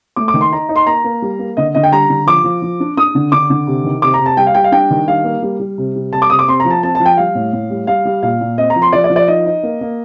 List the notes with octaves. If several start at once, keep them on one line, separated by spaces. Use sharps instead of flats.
A3 D6
D6
D#3
C6
D#4 A#5
D#4
C6
A#3 A#5
A#3
G3
A#3
D3 D#5
D3 D#5
G5
G3 A#5
D3
F3 D6
F3
F3
D4
D4 D#6
D3
D3 D6
D3
C3
D#3
C3 D6
A#5
C3
A5
G3 G5
F5
G3 G5
F5
D4 G5
D#3
G3 F5
A#3
G3
G3
C3
G3
C3 A5
D6
C3 D#6
D6
C4 C6
A#5
F3
A5
C4 A5
F3 A5
G5
G3 F5
A2
A2
G3
G3 F5
G3
A#2 F5
A#2
C4 D#5
A#5
F3
C6
F3 D5
D5
F3
D5
D#4 D#5
D#4
A#3
A#3